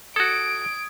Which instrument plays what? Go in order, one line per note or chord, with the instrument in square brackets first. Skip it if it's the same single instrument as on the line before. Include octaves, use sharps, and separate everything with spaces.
[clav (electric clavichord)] F#4 A4 [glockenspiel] D#6 G#6 [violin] D7